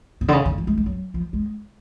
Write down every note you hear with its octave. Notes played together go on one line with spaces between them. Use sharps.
B2
D3
C#3
D3
F3
G#3
G#3
F#3
F3
G#3